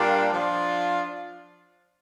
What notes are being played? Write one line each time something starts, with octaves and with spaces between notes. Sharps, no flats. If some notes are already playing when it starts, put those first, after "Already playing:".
Already playing: A#2 G3 A#3 D4 F4
F3 D4 F4